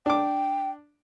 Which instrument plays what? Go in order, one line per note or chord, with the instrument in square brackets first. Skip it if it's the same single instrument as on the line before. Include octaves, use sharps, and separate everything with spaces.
[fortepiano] D4 D6 [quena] G5